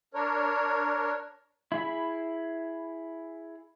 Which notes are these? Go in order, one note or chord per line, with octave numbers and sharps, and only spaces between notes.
D4 A#4 C#5
E4 G#4 B5